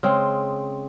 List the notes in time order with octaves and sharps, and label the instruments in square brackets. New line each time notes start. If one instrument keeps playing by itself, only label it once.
[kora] C#3 G#3 C4